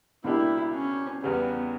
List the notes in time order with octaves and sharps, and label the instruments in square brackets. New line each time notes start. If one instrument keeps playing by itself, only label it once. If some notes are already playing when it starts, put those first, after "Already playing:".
[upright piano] C#2 B2 A#3 D4 G4 [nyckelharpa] E4
[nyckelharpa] C#4
[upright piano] E2 C#3 G3 [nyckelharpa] B3